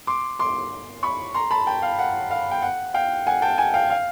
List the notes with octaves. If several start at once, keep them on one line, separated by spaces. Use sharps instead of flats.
C6 D6
C6 D6
B5 C#6
A#5 C6
A5 B5
G5 A5
F5
F#5
F5
G5
F#5
F5 G5
F#5 G#5
G5 A5
F#5 G#5
F5 G5
F5